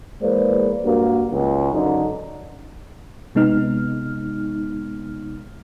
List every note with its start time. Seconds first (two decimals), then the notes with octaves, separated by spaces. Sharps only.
0.22 E2 G#3 A#3 B4 C5 D5
0.84 G2 A#3 F#4
1.32 C#2
1.73 F#2 D3 D#4
3.35 C3 G#3 B3 D#4 F6